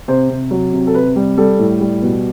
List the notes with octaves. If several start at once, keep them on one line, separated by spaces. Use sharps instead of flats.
C3 C5
C3
F#3
C3
A4
C3 B4
G3
G3 A4
A2
G3
B2